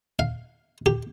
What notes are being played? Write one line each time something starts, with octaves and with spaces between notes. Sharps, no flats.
F5
G4